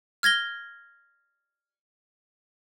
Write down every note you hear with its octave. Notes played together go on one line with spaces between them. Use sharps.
F6 G#6 A#6 G7